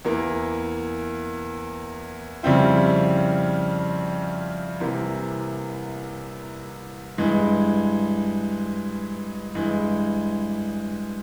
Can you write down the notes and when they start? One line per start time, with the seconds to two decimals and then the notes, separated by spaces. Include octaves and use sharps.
0.05 E2 E3 A#3
2.43 F2 C#3 G3 C4 E4
4.80 C2 C3 E3 A#3
7.18 G2 E3 G#3
9.55 G2 E3 G#3